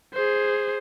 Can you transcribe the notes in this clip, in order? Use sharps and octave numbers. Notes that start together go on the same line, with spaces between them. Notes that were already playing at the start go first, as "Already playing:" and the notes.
G#4 C5